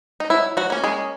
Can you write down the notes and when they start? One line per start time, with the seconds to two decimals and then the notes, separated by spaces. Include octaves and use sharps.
0.20 D#4
0.30 F#3 E4
0.57 F#3 F#4
0.70 A#3 C#4
0.84 G#3 G#4